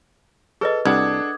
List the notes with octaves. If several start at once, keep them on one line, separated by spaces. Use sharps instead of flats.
G#4 A4 B4 D#5
C2 D4 A4 F#5 D6 D#6 G#6